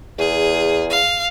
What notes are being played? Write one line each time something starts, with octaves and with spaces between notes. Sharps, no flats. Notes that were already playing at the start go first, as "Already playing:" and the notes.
E2 G#4
F5